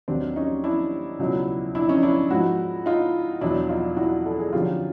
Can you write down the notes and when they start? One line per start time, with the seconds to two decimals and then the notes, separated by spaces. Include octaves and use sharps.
0.08 D#2 D#3 F#3 C4 D4
0.36 C#4 D#4
0.64 D4 E4
1.19 C#2 B2 F#3
1.75 D4 E4
1.89 C#4 D#4
2.03 D4 E4
2.30 G#2 F3 E4 F#4
2.86 D#4 F4
3.41 E2 B2 F#3 D4 E4
3.69 D#4 F4
3.97 E4 F#4
4.26 A4
4.39 G#4
4.53 F#2 D3 F3 F4 G4